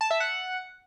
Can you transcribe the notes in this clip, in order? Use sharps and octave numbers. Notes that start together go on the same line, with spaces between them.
A5
E5
F#5